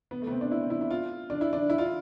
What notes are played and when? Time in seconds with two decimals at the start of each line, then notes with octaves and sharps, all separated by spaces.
0.11 B3
0.22 A3
0.27 B3
0.31 C4
0.41 D4
0.52 E4
0.62 C4
0.70 E4
0.81 E4
0.91 F4
1.30 D4
1.41 E4
1.53 D4
1.70 E4
1.78 F4